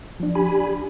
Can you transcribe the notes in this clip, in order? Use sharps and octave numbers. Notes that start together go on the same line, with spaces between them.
F3 D4
G4 G#5 B5
D4